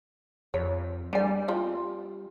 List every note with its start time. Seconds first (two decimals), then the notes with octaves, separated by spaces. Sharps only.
0.54 F2 C#5
1.13 G3 D4 G#5
1.48 C4 F4